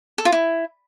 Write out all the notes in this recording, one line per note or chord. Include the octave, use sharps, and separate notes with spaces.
A4
F4
E4